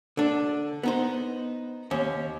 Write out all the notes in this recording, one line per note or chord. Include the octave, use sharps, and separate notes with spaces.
D3 D4
B3 D#4 C5
D#2 C#4